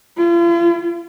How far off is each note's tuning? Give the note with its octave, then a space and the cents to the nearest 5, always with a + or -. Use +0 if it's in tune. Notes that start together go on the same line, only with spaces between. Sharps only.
F4 -45